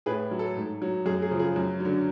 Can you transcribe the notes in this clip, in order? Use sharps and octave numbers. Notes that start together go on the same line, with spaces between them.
A2 G#4 B4
F#3
A4
G#2
F#3
F#2 G#4
G#4
C#3 F3
G#4
F#2
D3 F#3